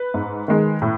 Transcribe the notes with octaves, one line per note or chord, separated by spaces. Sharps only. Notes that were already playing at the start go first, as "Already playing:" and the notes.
Already playing: B4
G#2
D#3 G#3
A2